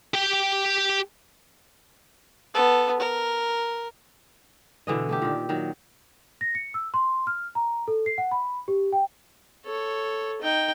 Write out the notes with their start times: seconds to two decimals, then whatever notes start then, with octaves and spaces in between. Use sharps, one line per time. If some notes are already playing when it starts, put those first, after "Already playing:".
0.14 G4 G5
2.54 B3 A4
3.00 A#4
4.87 B2 D3 E3 D#5
5.09 A3 D4 G4
5.22 A#2 D#3
5.49 D#3 F#3
6.41 A#6
6.55 C#7
6.74 E6
6.94 C6
7.27 F6
7.55 A#5
7.88 A4
8.06 C7
8.18 F#5
8.31 B5
8.68 G4
8.92 G5
9.65 A4 C#5
10.42 D#4 G5